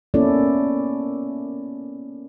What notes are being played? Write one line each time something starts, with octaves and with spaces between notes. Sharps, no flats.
A#3 B3 C#4 E4 A4 D5